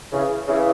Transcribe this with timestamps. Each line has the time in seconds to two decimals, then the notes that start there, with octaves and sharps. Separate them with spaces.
0.13 C#3 E3
0.48 C#3 E3